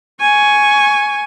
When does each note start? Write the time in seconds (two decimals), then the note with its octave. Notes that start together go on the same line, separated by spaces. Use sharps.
0.20 G#5 C#6